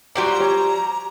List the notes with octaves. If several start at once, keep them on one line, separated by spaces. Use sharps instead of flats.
F3 G3 F#4 C5 G5 A#5 D6
G4 C#5